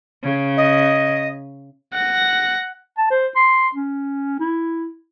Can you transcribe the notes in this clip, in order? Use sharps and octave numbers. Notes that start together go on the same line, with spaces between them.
C#3
D#5
F#5 A#6
A5
C5
C6
C#4
E4